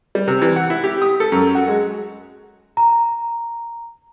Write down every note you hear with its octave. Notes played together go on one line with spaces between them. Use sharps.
G3
C3
E3
F#5
E4
G4
D#6
A4
F#2
F#4
G#3
A#5